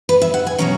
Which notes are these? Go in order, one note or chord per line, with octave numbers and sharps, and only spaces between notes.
B4
E5
F#5
G#5
B2 F#3 C#4 A#5